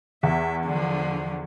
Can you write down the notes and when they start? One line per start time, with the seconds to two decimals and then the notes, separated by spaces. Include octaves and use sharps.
0.23 E2 E5
0.65 D3 F3